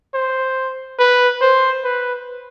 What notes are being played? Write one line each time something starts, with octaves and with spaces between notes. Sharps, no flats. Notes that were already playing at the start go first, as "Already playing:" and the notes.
C5
B4
C5
B4